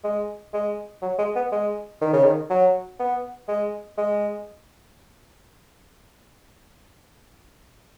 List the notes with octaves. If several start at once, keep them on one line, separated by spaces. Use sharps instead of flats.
G#3
G#3
F#3
G#3
B3
G#3
D#3
C#3
D#3
F#3
B3
G#3
G#3